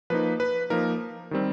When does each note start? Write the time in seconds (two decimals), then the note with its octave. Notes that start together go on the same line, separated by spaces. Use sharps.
0.10 F3 A#3 D#4 B4
0.40 B4
0.70 F3 A#3 D#4 A#4
1.31 D#3 G3 C4